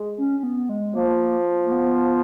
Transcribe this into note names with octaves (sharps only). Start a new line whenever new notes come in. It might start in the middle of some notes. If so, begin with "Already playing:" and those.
Already playing: G#3
C#4
C#4
B3
G#3
F3 A#3
A#3
B3